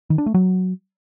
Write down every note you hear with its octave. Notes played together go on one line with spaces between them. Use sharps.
D#3
D4
A3
F#3